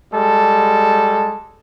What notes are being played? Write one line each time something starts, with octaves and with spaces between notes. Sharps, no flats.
G3 G#3 A4